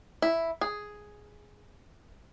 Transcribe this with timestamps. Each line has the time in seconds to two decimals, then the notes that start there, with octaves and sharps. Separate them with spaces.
0.22 E4
0.61 G#4